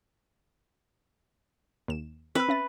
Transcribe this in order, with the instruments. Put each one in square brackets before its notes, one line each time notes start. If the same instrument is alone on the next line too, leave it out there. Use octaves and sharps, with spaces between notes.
[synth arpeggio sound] D#2 E7
[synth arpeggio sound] C4 E6 [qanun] B4
[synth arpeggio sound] C#4 E5 A6